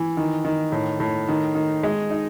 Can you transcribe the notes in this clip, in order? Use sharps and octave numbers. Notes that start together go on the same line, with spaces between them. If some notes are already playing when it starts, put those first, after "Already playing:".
Already playing: E3
D#3
D#3
A2
A2
D#3
D#3
G#3
D#4